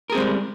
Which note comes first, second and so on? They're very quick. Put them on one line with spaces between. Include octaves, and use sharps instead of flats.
A#4 G#4 C4 G#3 G3